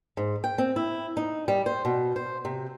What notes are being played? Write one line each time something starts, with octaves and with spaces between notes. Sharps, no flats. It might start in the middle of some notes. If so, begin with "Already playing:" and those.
G#2
G5
C4
E4
D#4
G3
C5
B2
C5
C3